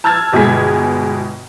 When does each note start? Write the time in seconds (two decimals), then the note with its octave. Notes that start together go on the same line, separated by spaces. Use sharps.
0.04 A5 E6 F6 G#6 A6
0.33 G1 B2 G#3 G#4 G#6 B6